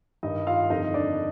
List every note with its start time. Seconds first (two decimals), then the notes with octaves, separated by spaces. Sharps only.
0.23 G2 D#3 D#4 D#5
0.47 F4 F5
0.70 F2 D3 D#4 D#5
0.94 D4 D5